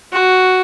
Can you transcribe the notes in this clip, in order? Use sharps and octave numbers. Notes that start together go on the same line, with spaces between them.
F#4